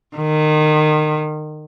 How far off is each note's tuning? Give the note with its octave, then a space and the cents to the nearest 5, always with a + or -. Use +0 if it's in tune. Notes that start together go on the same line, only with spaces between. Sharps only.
D#3 -25